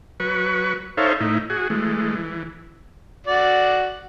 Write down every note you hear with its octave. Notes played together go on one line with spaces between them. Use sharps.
F#3 B4 C#6
D#4 A4 C5 C#5 E5 F5
A2 D#4 E4
F#4 G#4
E3 G#3 A3
E3
F#4 D5